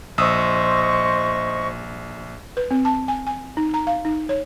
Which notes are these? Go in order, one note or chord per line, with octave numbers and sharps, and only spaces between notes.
A#1 C5 D#5 C#6 D#6 E6
B4
C4
A5
G#5
G#5
D#4
A#5
F5
D#4
C#5